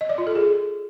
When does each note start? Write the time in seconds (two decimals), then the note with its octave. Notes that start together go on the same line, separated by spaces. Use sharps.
0.01 D#5
0.09 D5
0.18 F4
0.27 A4
0.35 G#4